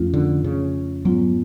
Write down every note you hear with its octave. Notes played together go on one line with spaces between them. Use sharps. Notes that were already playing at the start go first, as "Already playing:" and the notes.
Already playing: F2 F3 A3 C#4 F4
D3
C#3
G#2 F#3 G#3 B3 F4